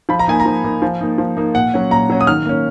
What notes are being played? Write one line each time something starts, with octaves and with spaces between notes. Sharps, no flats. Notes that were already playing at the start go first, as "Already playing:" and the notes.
F3 B5
A#5
A#3 D#4 G#5
A#5
F3
A#3 D#4
F3
A#3 D#4
F3
A#3 D#4
A#2 F#5
F#3 C#4
A#2 A#5
F#3 C#4
D#6
D#3 F6
A#3 C#4